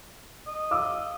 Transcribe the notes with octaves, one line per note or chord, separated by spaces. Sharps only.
D#5
F5 D6 E6